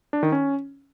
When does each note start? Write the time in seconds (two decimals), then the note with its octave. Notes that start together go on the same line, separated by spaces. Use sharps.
0.13 D4
0.23 D#3
0.32 C#4